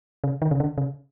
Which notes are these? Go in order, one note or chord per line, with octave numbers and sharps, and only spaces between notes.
C#3
D#3
C#3
D3
C#3